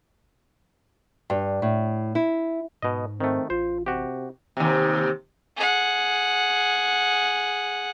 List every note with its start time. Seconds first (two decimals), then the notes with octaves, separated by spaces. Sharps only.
1.30 G2
1.62 A2
2.15 E4
2.82 G#2 B2 D#5
3.20 D#3 A3 C4
3.50 A1 F4 C5
3.86 C3 F#4 G4
4.57 D#2 C3
5.56 G#4 F#5